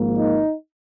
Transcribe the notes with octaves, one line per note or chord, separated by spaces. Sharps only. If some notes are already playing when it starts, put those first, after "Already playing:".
Already playing: G#1 G#2 F3 A#3
D#4